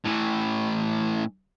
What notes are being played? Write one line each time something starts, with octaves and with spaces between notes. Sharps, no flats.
A2 E3